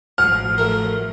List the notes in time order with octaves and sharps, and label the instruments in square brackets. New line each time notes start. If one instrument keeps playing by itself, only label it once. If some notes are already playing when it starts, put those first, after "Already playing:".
[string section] A1 F3 F#3 [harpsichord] F#5 [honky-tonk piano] F6
[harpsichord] A3 A#4